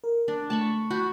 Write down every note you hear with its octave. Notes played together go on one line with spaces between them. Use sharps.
A#4
D4
A3 A5 B5 C#6
F#4 B5 F#6 G6